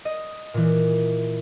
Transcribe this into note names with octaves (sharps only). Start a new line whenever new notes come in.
D#5
A#2 E3